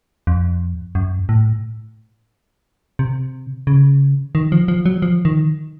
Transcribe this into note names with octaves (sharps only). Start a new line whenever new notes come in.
F2
F#2
A2
C3
C#3
D#3
F3
F3
F#3
F3
D#3